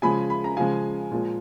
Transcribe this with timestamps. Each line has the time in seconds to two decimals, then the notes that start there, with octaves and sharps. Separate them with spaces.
0.02 C#3 F3 G#3 G#5 B5
0.30 B5
0.44 A#5
0.57 C#3 F3 G#3 F5 G#5
1.11 A#2 F3 G#3